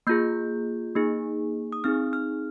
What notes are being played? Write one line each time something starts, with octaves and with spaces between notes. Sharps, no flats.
A#3 F4 G#4 G6
A#3 D#4 G#4
D#6
C4 D#4 G#4 F6
F6